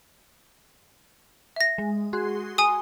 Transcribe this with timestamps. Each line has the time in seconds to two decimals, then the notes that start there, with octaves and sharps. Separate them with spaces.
1.56 E5 A#6
1.78 G#3
2.13 F#4 G#4 C6
2.58 G#5 D#6